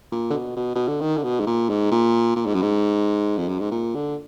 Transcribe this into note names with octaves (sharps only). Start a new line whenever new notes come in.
A#2
D3
B2
B2
B2
D3
D#3
D3
B2
G#2
A#2
G#2
A#2
A#2
G#2
F#2
G#2
F2
F#2
G#2
A#2
D3